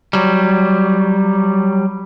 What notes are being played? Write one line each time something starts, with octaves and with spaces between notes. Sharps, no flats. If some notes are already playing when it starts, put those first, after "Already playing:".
F#3 G3